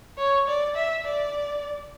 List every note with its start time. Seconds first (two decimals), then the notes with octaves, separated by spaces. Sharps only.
0.18 C#5
0.48 D5
0.75 E5
1.05 D5